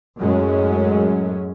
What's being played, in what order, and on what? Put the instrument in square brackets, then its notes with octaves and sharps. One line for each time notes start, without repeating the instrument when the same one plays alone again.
[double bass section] F#2 A2 F#3 G#3 C#4